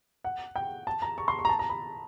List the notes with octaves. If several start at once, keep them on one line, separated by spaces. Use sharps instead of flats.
F#5
G5
A5
A#5
C#6
C6
C#6
A#5
A5
A#5
B5